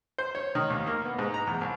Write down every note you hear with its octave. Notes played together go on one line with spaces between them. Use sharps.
C5
C#5
D#3
D#2
A#3
B3
G#2
A#5
E2
C2